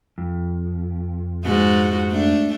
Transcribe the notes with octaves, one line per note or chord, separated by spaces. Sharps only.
F2
G#2 F#4
A3 D4